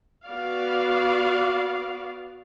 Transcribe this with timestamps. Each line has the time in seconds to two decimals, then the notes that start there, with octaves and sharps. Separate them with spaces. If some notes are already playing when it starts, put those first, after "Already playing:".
0.25 B3 F#4 D5 F5